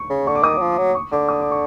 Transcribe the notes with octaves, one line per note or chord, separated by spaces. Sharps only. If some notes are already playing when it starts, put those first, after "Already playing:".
Already playing: C#6
C#3
D3 C#6
D6
D#3 D#6
F#3 D6
F3
F#3
C#6
D3 D6
D#6
D6
C#6